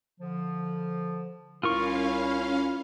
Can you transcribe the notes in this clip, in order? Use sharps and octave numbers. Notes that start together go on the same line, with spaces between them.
D3 F3
C2 C#4 E4 F4 A#4 F5 C#6